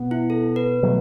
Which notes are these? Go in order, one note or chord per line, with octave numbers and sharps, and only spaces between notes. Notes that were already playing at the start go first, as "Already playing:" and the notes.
Already playing: B2 B3
E4
A4
B4
B2 F#3 A3